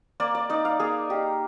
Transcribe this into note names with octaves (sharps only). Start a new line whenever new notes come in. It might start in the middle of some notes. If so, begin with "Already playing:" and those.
A#3 D5
D5
D#4 D5
F5
A#3 G#4
D#4 G4